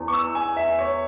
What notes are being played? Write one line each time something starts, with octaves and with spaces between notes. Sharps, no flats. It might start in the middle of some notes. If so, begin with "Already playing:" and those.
Already playing: E2
C#6
E6
G#5
E5
C#5